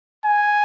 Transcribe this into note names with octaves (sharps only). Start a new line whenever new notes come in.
G#5